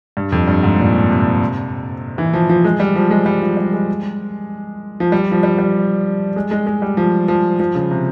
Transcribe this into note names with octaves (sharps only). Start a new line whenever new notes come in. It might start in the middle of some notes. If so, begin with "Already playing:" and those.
G2
F2
G2
G#2
A#2
C3
E3
F3
F3
G#3
G3
F3
G#3
G3
F3
G3
G#3
F3
G3
F3
G3
G3
G#3
G#3
G#3
G3
F3
F3
F3
C#3
C3